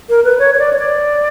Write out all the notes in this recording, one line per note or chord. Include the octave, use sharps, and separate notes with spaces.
A#4
B4
C#5
C#5
D5
C#5
D5